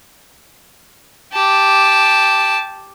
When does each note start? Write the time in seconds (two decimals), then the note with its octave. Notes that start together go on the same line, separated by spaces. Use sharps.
1.33 G4 A5